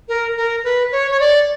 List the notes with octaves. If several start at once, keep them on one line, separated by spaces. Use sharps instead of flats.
A#4
A#4
B4
C#5
C#5
D5